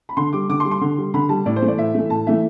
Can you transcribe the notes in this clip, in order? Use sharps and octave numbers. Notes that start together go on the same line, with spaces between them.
B5
D3 C6
G3 D6
D3 D6
C6
G3
C6
D3
G3
D3 B5
G3 A5
A2 D5
C5
E3 A3
D5
A2 E5
E3 A3
A2 A5
E3 A3 E5